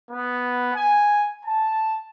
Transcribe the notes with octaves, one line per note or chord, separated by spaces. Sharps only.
B3
G#5
A5